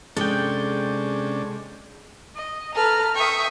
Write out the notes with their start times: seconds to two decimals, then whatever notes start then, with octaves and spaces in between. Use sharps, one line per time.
0.17 C3 G#3 C#4 D4 A4 G5
2.35 D#5
2.74 A4 B4 A#5 F6
3.15 E5 G5 C#6 D#6